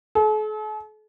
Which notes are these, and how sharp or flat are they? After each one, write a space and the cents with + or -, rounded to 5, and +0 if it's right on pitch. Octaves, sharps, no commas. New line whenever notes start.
A4 -45